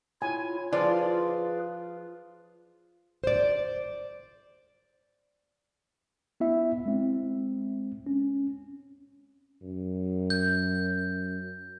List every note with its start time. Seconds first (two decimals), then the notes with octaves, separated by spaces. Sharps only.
0.22 E4 F4 C#5 G#5
0.73 F3 F4 G#4 B4 D5
3.24 C5 D5
6.40 B3 E4 E5
6.86 G#3 C4
8.07 C#4
9.62 F#2
10.30 G6